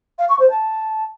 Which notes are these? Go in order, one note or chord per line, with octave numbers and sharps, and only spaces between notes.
F5
C#6
C5
A5